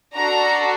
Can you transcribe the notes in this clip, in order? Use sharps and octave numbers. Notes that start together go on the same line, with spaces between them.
D4 F#4 A4 A#5